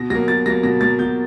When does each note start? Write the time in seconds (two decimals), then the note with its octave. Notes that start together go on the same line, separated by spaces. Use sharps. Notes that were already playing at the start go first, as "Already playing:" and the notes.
Already playing: B2 A#6
0.10 F#3 A#3 A#6
0.28 B2 A6
0.46 F#3 A#3 A#6
0.63 B2 A#6
0.81 F#3 A#3 A6
0.99 B2 G6